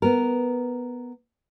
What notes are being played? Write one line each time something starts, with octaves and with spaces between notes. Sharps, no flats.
B3 A#4